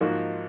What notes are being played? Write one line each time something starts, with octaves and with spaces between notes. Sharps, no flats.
G#2 F3 A#3 D#4 F#4